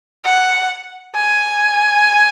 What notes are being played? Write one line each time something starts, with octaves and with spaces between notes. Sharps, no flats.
F#5
G#5